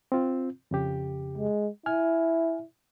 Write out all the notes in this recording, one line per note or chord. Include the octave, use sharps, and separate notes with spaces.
C4 F4
F2 C#3 G4
G#3
E4 G#5 F6